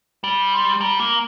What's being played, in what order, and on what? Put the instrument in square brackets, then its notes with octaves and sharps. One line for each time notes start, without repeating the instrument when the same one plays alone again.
[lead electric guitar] G3
[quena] C6
[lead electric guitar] G3 [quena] A#5
[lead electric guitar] A#3